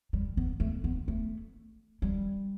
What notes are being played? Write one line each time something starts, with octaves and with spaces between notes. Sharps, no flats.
G3
B3
A3
B3
A3
G3